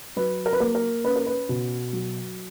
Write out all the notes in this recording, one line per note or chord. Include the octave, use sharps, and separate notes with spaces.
F#3 B4
A#4
B4
A#3 A#4
A#4
C#4 B4
A#4
B4
B2
F#3